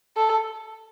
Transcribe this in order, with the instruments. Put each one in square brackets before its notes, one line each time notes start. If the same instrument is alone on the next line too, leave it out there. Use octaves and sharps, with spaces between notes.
[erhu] A4